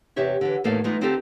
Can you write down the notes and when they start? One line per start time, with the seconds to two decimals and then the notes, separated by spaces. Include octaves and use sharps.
0.16 E2 C3 G4 C#5 E5
0.41 D3 E3
0.64 E2 A2 D#3 A#3 A4 F5
0.84 E3 G#3 A3 B3 D#4 F4
1.01 D3 C4 D#4 F4 G4 A4